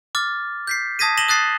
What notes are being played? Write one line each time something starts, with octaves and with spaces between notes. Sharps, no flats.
D6 F6 A6
G6 B6 C7
A5 D#6 G#6 A#6 B6 D#7
A#6 D#7 E7 F#7 G7
D#6 F#6 A6 C7